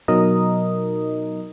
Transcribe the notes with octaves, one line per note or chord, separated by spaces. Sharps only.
B2 F#3 D#4 A#4 D#5